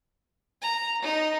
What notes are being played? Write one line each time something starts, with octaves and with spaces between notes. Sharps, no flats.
A#5
D#4